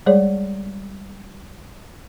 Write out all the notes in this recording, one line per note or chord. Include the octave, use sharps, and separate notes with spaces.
G3 G#3 G#4 C#5 D5